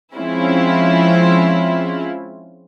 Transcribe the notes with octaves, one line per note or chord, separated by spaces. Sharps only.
F3 G#3 C4 C#4 E4 F4